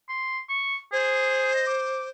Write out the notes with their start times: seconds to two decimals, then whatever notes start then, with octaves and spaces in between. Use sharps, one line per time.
0.09 C6
0.49 C#6
0.93 G#4 C5
1.54 D#5
1.67 D6